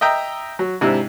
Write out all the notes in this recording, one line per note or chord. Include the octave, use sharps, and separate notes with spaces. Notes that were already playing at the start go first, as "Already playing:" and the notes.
D#5 E5 G5 A#5
F#3
G#2 C3 D4 E4